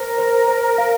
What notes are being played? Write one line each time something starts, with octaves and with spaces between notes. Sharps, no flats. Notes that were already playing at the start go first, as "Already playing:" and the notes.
Already playing: A#4 C5
C5
C5
F5